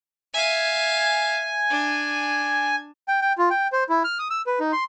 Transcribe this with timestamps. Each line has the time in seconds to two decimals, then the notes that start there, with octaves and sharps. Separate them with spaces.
0.34 E5 F5 G#5
1.70 D4
3.08 G5
3.22 G5
3.38 F4
3.50 G5
3.72 C5
3.89 E4
4.04 F6
4.19 D#6
4.30 E6
4.46 B4
4.60 D#4
4.72 C6